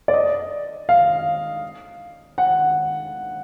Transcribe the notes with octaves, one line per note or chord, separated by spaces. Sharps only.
D5
D#5
F5
F#5